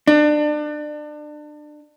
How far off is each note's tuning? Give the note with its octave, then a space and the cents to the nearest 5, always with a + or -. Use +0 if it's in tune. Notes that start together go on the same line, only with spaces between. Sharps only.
D4 +30